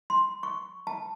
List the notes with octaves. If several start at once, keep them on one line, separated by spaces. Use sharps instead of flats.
C6
C#6
A5